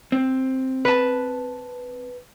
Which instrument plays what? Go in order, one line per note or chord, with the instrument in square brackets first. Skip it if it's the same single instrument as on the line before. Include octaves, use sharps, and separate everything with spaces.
[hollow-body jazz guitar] C4
[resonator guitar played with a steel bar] B4 A5